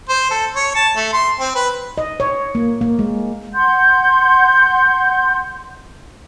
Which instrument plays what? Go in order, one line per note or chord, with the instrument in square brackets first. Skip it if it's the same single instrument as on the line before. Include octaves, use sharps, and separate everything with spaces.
[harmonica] C5
A4
C#5
A5
A3
C6
C4
B4
[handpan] D#5
C#5
A#3
A#3
G#3
[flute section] F#5 C6 G6